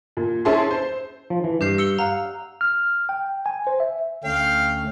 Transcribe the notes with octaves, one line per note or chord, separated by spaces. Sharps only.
A#2
C#4 E4 G#4 E5 A5 C6
C5
F3
E3
G2 G4 G6 C7
E6 C#7 G7
F5 F#5 A#5
F6
G5
G#5
C5
E5
D2 A3 C#4 F5 G5